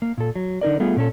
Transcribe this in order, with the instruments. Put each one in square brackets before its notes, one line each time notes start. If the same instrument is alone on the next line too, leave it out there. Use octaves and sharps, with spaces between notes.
[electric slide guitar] A#3
A#2 A4
F#3
D3 D#4 A#4 D5
G3 A3 B3 F4 G#4
A#2 C#4 A4